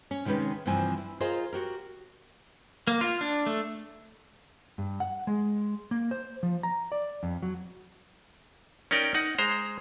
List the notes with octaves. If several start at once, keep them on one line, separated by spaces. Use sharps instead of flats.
C#4
C3 D#3 G#3 C#4 B4
G2 C3 E3 F3 C4 G#5
E4
F4 G#4 A#4 C5 D#5 F5
F#4 G4 A#4
A#3
F4
D4
A3
G2
F#5
G#3
A#3
C5
F3
A#5
D5
F2
F#3
C#4 D#4 A#4 D5 G5
D#4 F#5
G#3 C5 A#5